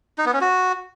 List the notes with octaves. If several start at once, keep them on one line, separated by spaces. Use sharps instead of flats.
D#4
B3
C#4
F#4